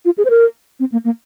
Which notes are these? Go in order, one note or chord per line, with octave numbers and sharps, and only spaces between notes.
F4
G#4
C5
A#4
C4
A#3
A#3